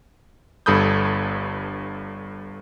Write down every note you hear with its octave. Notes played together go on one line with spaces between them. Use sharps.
G1 G2 A4 B5 D#6 G6